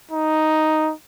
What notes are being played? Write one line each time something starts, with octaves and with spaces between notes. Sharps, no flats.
D#4